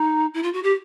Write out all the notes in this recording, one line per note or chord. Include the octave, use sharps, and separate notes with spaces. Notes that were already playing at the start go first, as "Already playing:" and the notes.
Already playing: D#4
E4
F4
F#4
G4